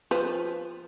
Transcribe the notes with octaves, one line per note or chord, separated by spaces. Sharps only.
F3 B4